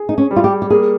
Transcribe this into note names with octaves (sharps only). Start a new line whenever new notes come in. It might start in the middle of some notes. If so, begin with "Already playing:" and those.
Already playing: G#4
D#4
C#4
G3
F4
G4
G4
A#3 G#4